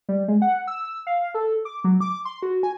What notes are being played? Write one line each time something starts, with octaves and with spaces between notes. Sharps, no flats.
G3
G#3
F#5
E6
F5
A4
D6
F#3
D6
C6
F#4
G#5